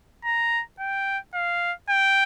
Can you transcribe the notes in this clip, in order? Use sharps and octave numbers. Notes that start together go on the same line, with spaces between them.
A#5
G5
F5
G5